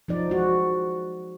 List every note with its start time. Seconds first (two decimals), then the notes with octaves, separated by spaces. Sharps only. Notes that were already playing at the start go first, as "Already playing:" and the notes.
0.08 F3 D#4 D5
0.30 G#3 F#4